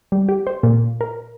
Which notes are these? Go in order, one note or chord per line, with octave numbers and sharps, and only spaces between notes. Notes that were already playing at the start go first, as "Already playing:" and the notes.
G3
G4
C5
A#2
A#4